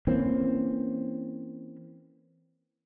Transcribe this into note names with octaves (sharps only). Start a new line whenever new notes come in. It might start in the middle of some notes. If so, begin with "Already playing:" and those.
E3 A#3 C4 C#4